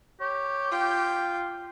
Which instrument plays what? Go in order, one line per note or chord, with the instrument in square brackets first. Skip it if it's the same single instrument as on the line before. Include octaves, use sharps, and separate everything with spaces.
[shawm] G4 [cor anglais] C#5
[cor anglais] F4 [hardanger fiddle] G5